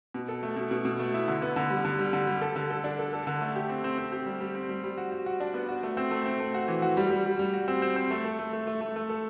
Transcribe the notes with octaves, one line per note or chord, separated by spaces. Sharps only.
B2
A4
A3
B2
B2
B2
A3
E4
D3
B3
D3
G3
D3
G3
D3
G3
A4
D3
A4
D4
A4
A4
D3
A3
G4
C4
C4
C4
G4
G3
G3
C4
G3
G3
F#4
F#4
F#4
D4
B3
F#4
A3
C4
A3
C4
A3
F#4
E3
F#4
G3
G3
G3
G3
F#4
C4
C4
C4
A3
A4
A3
A3
A3
A3
A3
A4